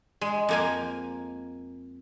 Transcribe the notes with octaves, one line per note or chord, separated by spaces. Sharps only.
G#3
F2 A#3 G#5